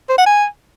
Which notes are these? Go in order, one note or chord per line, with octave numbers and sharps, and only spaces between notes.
C5
F#5
G#5